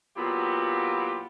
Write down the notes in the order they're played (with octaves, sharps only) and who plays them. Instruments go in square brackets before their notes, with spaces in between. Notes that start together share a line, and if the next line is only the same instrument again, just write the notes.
[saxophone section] A#2 F#3 B3 E4 F4 G4